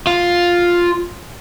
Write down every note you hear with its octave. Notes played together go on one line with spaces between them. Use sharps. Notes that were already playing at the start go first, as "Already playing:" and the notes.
F4